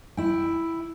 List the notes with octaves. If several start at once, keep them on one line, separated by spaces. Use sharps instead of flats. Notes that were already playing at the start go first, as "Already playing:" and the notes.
E4 G5